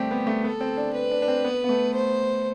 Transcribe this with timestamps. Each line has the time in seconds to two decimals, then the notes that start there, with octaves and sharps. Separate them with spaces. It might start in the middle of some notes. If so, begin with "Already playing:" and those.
Already playing: G3 A3 C4 G4
0.11 B3
0.27 A3
0.44 B3 A4
0.61 C4
0.77 D4
0.94 B4
1.11 D4
1.22 D4
1.28 C4
1.44 B3
1.64 B3
1.69 A3
1.95 C5